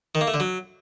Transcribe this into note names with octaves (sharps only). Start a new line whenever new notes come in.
D#3
A#3
A3
D3
F#3